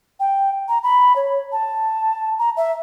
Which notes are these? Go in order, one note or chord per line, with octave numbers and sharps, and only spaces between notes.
G5
A#5
B5
C#5
A5
A#5
E5